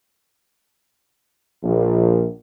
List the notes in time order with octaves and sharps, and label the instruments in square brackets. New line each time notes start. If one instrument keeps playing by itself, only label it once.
[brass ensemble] A#1